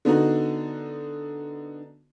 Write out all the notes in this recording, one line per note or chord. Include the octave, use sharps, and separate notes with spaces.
D3 B3 D#4 F#4